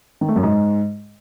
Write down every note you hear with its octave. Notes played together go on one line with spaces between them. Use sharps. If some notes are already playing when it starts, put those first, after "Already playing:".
D#3
A3
F#2
G#2